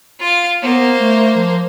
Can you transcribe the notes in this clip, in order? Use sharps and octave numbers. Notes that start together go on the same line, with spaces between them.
F4 F5
A#3 B3 C5
A3
F3